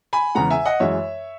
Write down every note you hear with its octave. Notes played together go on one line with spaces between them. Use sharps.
G#5 B5
E2 C#3 G#3 F#5 A#5
E5 G#5
D#5 F#5
F#2 E3 G#3 C#5 E5